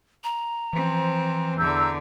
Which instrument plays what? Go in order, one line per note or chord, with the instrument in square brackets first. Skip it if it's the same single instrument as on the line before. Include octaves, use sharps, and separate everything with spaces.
[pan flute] A#5
[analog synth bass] E3 [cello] F3 C4
[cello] E2 D3 [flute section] A#5 E6 G6